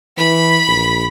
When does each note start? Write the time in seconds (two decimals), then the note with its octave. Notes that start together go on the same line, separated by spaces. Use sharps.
0.18 E3 B5 B6
0.68 A#1